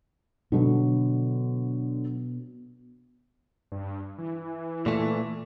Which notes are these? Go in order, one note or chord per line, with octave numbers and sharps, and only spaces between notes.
B2 D3 F#3
G2
E3
A#2 A3